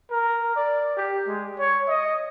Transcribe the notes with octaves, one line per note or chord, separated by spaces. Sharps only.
A#4
D5
G4
G#3
C#5
D#5